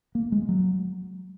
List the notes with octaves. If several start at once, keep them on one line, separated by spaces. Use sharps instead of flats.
A#3
G#3
F#3